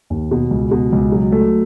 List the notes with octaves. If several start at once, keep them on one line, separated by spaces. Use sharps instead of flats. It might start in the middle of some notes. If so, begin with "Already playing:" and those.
D#2
B2
C#2
B2
C#2
F#3
A3